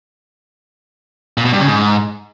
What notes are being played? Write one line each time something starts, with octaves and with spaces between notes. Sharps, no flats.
A#2
B2
G2
C#3
G#2